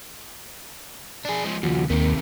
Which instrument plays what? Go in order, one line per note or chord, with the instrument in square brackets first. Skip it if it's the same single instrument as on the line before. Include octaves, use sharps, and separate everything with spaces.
[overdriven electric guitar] D4 G#4
F3 G#3
[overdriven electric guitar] D#2 C#3 [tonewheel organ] F3 F#4
[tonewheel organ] D#2 A#3 [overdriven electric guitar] C3 D#3